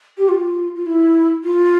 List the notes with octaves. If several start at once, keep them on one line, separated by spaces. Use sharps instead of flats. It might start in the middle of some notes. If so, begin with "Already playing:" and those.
G4
F4
F4
E4
F4